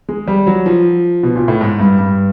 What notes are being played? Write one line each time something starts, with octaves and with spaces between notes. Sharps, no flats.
G#3
G3
F#3
F3
B2
A#2
A2
G#2
G2
G2